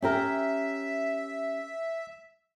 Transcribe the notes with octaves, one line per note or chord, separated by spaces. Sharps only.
C#4 G4 A#4 E5